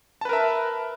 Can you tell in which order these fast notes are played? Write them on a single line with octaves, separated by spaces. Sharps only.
A5 B4 A#4 E5